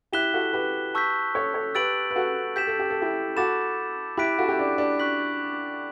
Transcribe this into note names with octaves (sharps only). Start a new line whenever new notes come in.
E4 G4 F#6 B6 E7 G7
F#4 A4
G4 B4
A5 C#6 E6 G6 B6
A4 C#5
A4 C#5
G4 B4 E6 A6 D7 F#7
B4
F#4 A4
G4 G6 B6 E7
A4
G4
A4
E4 G4
F#4 A4 B5 D6 A6 E7
E4 G4 B5 F#6 B6 D7
F#4 A4
E4 G4
D4
D4
C#6 F#6 B6 F#7